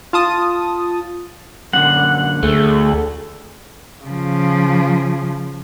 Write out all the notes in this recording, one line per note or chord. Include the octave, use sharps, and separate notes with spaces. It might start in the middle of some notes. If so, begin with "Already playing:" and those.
F4 A5 D#6
F#2 A#2 D3 F#5
D2 A3 G#4 A4
C#3 F3